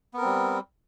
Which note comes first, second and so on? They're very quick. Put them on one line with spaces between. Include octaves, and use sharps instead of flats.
B3 A#4 C4 G3